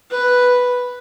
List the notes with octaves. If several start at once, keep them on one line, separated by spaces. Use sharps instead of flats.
B4